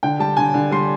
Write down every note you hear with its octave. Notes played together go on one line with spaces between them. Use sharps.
D3 G5
G3 A5
D3 G#5
D3
G3 C6